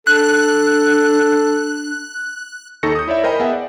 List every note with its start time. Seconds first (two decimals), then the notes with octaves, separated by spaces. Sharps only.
0.07 D4 A4 F#6
2.83 D#2 D#4 A4 C#6 A#6 C#7
2.95 D#6 G6
3.08 E4 C#5 D5 E5 B5
3.24 A#4 C5 D#5 G5 G#5 B5
3.40 B3 G#4 E5 F#5
3.53 D5